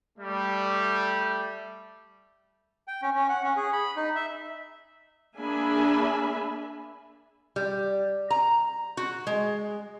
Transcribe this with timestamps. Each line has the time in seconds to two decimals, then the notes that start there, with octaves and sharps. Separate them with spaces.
0.18 G3 A3
2.88 G5
3.02 C#4
3.15 C#4
3.29 F#5
3.44 C#4
3.57 G#4
3.73 B5
3.96 D#4
4.15 E5
5.38 A#3 D4 G#4 E5 G#5 B5
7.56 G3
8.30 A#5
8.97 F#4
9.27 G#3